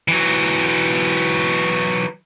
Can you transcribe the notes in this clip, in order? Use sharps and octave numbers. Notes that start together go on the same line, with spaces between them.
E3 F#3